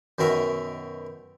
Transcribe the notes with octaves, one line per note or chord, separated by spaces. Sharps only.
F#2 B2 D#3 A#4 E5